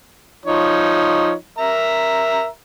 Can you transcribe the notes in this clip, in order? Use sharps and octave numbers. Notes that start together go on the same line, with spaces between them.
F3 D#4 C#5
A#4 E5 A#5